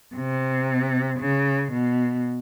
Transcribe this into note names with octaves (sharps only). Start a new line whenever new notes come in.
C3
C#3
B2